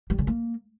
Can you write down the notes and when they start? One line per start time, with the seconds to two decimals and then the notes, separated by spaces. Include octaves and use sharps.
0.10 G3
0.19 C#3
0.27 A#3